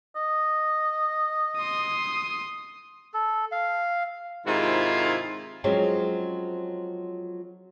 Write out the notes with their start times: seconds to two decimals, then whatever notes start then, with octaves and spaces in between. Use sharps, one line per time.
0.16 D#5
1.59 C6 D#6
3.13 A4
3.52 F5
4.47 G#2 C3 D#3 E4 F4
5.64 F3 F#3 G#3 C4 C#4